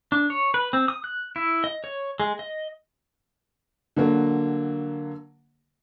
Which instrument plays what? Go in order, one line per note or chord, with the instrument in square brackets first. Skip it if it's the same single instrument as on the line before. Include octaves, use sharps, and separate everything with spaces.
[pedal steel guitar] D4
C#5
B4
C4
D#6
F#6
E4
D#5
C#5
G#3
D#5
[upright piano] D3 F#3 A#3